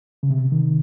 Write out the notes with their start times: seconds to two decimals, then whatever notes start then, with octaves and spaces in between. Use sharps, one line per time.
0.23 C#3
0.30 C3
0.52 D#3